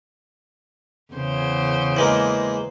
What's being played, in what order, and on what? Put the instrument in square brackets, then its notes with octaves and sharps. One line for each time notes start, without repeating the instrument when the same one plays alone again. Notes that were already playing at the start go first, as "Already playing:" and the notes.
[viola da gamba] E2 C#3 C5
[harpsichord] E3 G#3 A#3